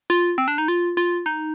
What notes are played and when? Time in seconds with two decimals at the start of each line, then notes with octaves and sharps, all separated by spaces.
0.10 F4
0.38 C4
0.48 D4
0.58 D#4
0.68 F4
0.97 F4
1.26 D#4